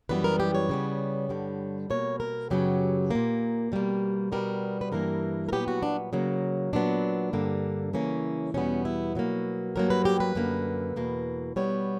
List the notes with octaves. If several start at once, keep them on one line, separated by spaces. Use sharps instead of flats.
F#2 E3 G3 B3 B4
A#4
G4
C#5
C#3 G3 B3
G2 D3 G3
B2 A#3 C#5
A#4
F#2 C#3 F#3 B3 G4
A#2 A#3
B2 G3 A#3
B2 G3 B3 A#4
B4
G2 E3 A#3 A#4
A#4
A#2 F#3 B3 G4
F#4
D4
C#3 F#3 A#3
A#2 F#3 B3 D4
G2 D3 A#3
C#3 E3 A#3 C#4
E2 B2 G3 B3 C#4
E4
B2 F#3 A#3
G2 F#3 A#3 A#4
B4
G4
B4
F#2 D3 A#3
E2 B2 A#3
B2 G3 B3 C#5